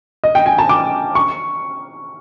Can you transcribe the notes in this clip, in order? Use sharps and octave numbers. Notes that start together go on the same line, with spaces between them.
D#5
G5
G#5
A5
D6
C#6